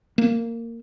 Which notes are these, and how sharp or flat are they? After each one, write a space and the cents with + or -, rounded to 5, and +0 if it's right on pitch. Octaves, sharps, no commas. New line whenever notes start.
A#3 -15